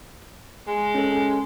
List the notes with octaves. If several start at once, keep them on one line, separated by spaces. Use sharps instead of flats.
G#3
C#4 A4